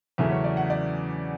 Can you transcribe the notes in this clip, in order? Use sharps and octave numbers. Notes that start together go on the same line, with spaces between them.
E2 C#3 F#3 A3 C#4 E5
C#5
D5
F#5
D5